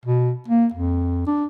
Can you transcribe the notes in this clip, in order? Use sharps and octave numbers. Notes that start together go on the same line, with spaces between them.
B2
A#3
F2
D4